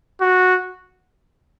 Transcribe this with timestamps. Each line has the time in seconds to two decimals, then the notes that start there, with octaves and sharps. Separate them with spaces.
0.21 F#4